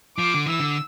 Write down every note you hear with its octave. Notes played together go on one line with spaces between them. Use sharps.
F3 D6
D3
E3 E6
D3